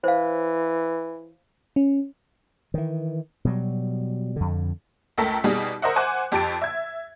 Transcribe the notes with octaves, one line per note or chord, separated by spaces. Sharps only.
E3 C5 F5
C#4
D#3 E3
B2 F#3 G3
F2 D3
C#2 A3 A4 A#4 B6
B2 G3 D#4 G#4
A#4 C5 D#5 E5 F#5
C5 F#5 G#5 D6 F#6
F2 G4 A5 A6 D7
E5 G#6